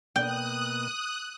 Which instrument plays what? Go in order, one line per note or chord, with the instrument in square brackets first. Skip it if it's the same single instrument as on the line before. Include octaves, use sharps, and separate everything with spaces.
[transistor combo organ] B2 A#3 [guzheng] G5 [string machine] D#6 F#6